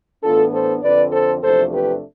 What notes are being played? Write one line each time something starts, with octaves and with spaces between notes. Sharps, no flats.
A2 E3 B3 D4 F4 A4
A4 C5
F2 D3 F3 C4 B4 D5
A4 C5
E2 C3 F3 A3 D4 A4 C5
G4 B4